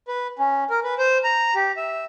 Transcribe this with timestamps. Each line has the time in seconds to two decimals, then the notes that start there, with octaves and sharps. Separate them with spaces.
0.08 B4
0.39 C#4
0.70 A#4
0.84 B4
0.98 C5
1.24 A#5
1.55 G4
1.77 E5